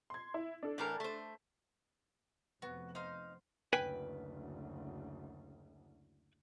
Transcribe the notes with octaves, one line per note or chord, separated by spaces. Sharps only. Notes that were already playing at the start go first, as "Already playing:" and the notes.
C6 G#6
E4
D4 A4
A2 E3 A#4
A3 C5
F1 F2 B3 F#4
D#4 C5 F5 F6
F#1 D2 B4 G5 G#5